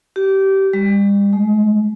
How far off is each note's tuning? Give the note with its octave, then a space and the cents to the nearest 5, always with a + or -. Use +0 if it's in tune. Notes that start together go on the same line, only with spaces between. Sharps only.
G4 -20
G3 +40
G#3 +40